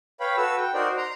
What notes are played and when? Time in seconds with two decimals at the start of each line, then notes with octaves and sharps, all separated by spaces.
0.20 B4 C#5 F5 G5 B5
0.37 F#4 A4 B4 E6
0.57 G5
0.74 D#4 F#4 A#4 C5 D5
0.97 A#5 C6